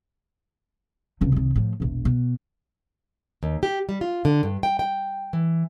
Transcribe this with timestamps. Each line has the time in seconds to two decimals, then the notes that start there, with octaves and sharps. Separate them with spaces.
1.21 C#2 C3
1.32 C2 D#3
1.55 A2 F3
1.80 E1 A#1
2.05 B2
3.43 D#2
3.63 G4
3.89 G3
4.01 F4
4.25 D3
4.43 G2
4.63 G5
4.79 G5
5.33 E3